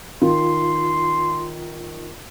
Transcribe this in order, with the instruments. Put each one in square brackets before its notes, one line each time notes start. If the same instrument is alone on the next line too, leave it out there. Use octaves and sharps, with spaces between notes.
[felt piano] D#3 [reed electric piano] F4 [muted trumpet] C6